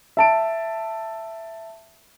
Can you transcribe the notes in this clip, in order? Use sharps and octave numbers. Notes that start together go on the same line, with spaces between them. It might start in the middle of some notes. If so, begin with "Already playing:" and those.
E5 A5 D7